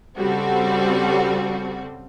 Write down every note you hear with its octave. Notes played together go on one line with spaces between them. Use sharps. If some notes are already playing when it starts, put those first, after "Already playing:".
C#3 G3 C4 F#4 A4